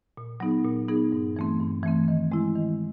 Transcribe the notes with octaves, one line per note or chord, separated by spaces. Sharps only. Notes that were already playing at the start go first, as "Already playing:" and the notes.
A#2
F#3 B3 D#4 G#4
A#2
F#3 B3 D#4 G#4
G2
E3 A3 C4
G2
E3 A3 C4
D#3
G#3 C4 E4
D#3